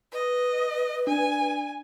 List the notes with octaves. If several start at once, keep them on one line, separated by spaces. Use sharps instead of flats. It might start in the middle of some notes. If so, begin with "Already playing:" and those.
B4 D#5
D4 G#5